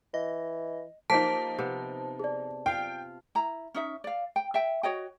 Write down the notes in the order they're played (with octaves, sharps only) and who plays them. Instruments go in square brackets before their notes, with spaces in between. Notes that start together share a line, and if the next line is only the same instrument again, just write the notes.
[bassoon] E3 [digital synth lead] D#5
[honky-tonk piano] F3 D#4 [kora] A#3 G4 [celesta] C5 B6 [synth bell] A5
[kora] C3 B3
[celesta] G#4 D5
[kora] F4 F5 [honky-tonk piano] G5
[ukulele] E4 A#5
C#4 D#4 E5
D5 F5
G5
E5 G5
F#4 C#5 D#5 G5